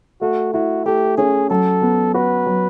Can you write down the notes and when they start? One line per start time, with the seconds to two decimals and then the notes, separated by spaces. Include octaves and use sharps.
0.21 A3 F#4
0.54 E4 F#4
0.86 A3 G4
1.17 C#4 G#4
1.50 F#3 A4
1.82 B3
2.14 F#4 B4
2.47 F#3